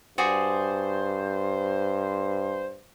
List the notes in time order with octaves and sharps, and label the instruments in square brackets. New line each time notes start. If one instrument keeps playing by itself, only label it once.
[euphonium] G2 [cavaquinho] F#4 G#4 D5 [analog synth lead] C5